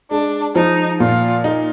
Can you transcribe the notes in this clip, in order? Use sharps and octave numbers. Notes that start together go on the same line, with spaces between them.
G#3 D4
F3 D#4
A#2 F4
D#4